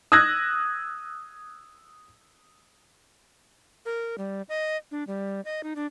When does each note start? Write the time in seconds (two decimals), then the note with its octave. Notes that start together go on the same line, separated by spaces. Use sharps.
0.12 D#6 E6 F#6 G#6 A#6
3.86 A#4
4.18 G3
4.49 D#5
4.91 D4
5.07 G3
5.45 D#5
5.63 D#4
5.76 D4